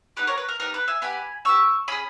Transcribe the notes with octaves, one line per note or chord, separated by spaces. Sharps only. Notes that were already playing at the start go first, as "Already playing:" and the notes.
B3 D#4 G4 B4
A#4 C#5
B4
A#4
B3 D#4 G4 A#4
B4
E5 G#5
B3 G4 G#5 B5
B3 G4 C#6 E6
C#4 G#4 B5 D#6